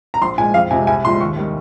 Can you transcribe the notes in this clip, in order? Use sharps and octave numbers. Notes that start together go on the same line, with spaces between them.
A#5
A#1 C6
A#2 G#3 G#5
F2 F5
C3 F3 G#3 G#5
C2 G#5
A#2 F3 G#3 C6
D#2 C#6
D#3 G3